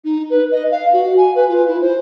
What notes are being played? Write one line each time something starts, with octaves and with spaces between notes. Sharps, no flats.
D#4
B4
D#5
F5
F#4
G#5
B4
F4
E4
C5